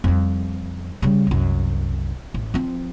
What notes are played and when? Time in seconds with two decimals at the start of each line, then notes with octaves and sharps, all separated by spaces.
0.04 F2 G3
1.02 C#3 G3
1.27 C2 F#2
2.34 A1
2.54 F3 C4